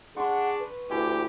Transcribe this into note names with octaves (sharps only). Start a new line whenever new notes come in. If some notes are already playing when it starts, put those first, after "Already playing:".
D4 G#4 F#5 C6 C#6
B4
D2 E3 G4